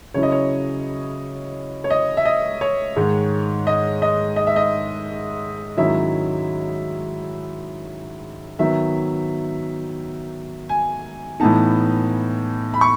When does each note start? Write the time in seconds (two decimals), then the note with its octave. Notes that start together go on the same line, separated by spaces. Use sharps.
0.14 C#3 F#3 C#4 E4 C#5
0.23 D#5
0.32 C#5
1.84 C#5
1.90 D#5
2.17 E5
2.25 D#5
2.61 C#5
2.96 G#2 D#3 G#3
3.67 D#5
4.02 D#5
4.36 D#5
4.47 E5
4.56 D#5
5.77 G#2 D#3 F#3 C#4 E4 E5
8.59 D#3 F#3 B3 E5
10.69 G#5
11.40 A2 E3 B3 D#4 A5
12.74 B5
12.81 C#6